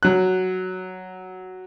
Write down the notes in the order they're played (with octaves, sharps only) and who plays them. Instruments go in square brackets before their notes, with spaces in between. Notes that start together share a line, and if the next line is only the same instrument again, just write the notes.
[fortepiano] F#3 F#6